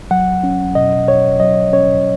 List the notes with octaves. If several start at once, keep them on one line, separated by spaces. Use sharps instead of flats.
F#3 F#5
C#4
B2 D#5
B2 C#5
F#3 D#5
C#4 C#5